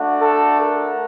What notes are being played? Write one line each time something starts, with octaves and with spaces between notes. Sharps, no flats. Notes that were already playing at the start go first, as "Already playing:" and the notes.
Already playing: A3 D4 F#4
A4
A#4